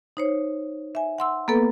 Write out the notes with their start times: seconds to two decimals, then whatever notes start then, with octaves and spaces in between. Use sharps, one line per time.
0.17 D#4 C5 C#5
0.95 E5 G#5
1.18 F#5 C6 E6
1.48 A#3 B3 A4 B4